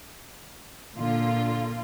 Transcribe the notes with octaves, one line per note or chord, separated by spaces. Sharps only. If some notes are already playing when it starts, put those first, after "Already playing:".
A#2 D3 F4